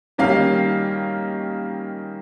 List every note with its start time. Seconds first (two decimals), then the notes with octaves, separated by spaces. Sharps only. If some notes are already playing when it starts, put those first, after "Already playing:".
0.18 D#3 G3 A#3 C#4 F5